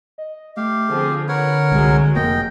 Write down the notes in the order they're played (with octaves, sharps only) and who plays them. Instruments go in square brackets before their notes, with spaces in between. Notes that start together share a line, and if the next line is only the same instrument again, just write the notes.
[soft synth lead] D#5
[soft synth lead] A3 [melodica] G4 F5
[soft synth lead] D3 [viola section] F3 C4 G#4
[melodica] A#4 C#5 F#5 [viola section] B4
[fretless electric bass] C2 [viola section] F#3 G#3
[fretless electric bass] F1 A#3 [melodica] D#5 G5